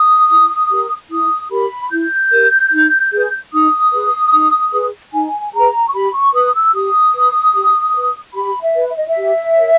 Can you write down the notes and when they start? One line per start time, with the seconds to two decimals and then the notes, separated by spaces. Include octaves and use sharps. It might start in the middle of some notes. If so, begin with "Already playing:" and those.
Already playing: D#6
0.31 E4
0.71 G4 A#4
1.11 E4 D#6
1.51 G4 A#4 B5
1.91 E4 G6
2.32 G4 A#4
2.72 D#4
3.12 G#4 B4
3.52 D#4 D#6
3.93 G#4 B4
4.33 D#4
4.73 G#4 B4
5.13 D#4 G#5
5.53 G#4 B4 A#5
5.89 C#6
5.93 G4 B5
6.14 C#6
6.34 B4 D#6
6.54 E6
6.74 G4 D#6
7.15 B4
7.54 G4
7.95 B4
8.35 G4 B5
8.62 E5
8.75 B4
8.89 E5
8.98 D#5
9.08 E5
9.16 G4
9.56 A#4 C#5